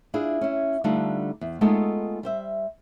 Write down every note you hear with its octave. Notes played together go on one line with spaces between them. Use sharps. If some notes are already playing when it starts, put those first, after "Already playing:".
D4 E4 F4 G#4
C#4 E4
D3 G3 A3 D4 D#4 F4
E2
G#3 A3 B3 D#4 F4 A4
G3 C5 E5